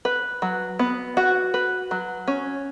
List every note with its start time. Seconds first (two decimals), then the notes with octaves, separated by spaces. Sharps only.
0.05 B4
0.42 F#3
0.79 B3
1.17 F#4
1.54 B4
1.91 F#3
2.27 C#4